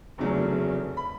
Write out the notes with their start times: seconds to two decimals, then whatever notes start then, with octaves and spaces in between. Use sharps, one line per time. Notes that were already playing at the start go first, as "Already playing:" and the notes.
0.18 F1 E2 C#3 F#3 A3
0.97 B5